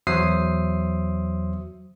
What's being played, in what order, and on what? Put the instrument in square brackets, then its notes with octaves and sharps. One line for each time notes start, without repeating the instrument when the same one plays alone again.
[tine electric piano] E2 F#3 C5 E5 D#6 C7